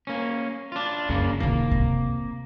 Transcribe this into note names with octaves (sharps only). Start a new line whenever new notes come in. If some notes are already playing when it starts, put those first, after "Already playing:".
A#3 C#4
D4 F4
F#2 C#3 A#3
D#2 C3 A#3
C3